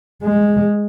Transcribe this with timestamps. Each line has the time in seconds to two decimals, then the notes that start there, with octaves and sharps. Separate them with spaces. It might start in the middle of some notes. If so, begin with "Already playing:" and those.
0.24 G#3